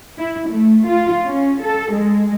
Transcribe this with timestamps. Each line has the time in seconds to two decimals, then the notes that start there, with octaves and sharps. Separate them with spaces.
0.19 E4
0.48 A3
0.86 F4
1.25 C#4
1.60 A4
1.92 G#3